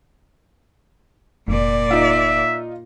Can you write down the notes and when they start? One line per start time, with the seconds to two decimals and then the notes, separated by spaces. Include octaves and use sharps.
1.48 F1 A#2 D5
1.91 D#4 F4 E5